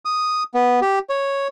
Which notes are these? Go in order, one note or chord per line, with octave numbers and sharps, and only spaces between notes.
D#6
B3
G4
C#5